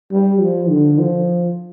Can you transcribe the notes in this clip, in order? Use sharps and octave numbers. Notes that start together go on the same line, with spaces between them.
G3
F3
D3
F3